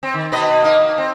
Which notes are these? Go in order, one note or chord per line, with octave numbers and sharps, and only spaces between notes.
C4
D#3
B2 B4 D#5
A#3 D#4
A#3
C4